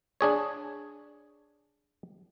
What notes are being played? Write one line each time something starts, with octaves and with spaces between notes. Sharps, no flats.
D4 G#4 C#5